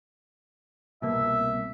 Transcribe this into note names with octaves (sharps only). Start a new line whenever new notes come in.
C2 B2 A#3 E5